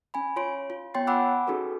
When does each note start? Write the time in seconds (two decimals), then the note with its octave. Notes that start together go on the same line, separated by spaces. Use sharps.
0.14 C#4 G#5 B5
0.36 F4 C#5 C6 D7
0.70 F4
0.94 B3 C#5 G5 C6 A6 C7
1.07 F#5 G#5 B5 D6 E6 F#6
1.47 C#4 D#4 F#4 G#4 A4 B4